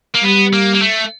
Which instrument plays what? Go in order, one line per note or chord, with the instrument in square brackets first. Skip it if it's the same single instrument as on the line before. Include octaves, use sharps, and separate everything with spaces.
[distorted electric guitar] A#3
[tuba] G3 [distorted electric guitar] B3
[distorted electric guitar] A#3
A#3
A3